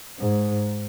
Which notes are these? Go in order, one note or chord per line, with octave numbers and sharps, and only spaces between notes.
G#2